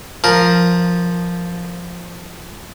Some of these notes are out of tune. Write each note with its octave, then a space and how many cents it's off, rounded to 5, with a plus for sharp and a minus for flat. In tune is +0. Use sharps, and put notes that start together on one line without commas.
F3 +0 A#4 +0